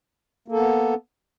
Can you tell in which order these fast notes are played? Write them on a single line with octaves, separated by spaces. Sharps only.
A#3 A4 B3